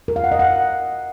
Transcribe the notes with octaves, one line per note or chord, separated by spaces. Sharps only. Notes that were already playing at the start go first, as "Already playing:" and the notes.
A#4
F5
F#5
D#5
F#5